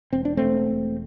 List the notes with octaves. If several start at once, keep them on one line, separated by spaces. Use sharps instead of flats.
E1 C4
D4
E1 A3 C4
E1